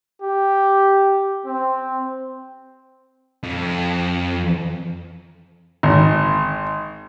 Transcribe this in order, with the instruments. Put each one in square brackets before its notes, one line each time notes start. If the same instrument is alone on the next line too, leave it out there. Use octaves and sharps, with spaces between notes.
[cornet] G4
C4
[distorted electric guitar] F2
[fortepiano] G#1